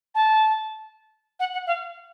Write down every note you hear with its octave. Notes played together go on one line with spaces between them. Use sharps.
A5
F#5
F#5
F5